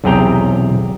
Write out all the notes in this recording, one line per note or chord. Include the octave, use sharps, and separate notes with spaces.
B1 E2 C3 G#4 G5 A#5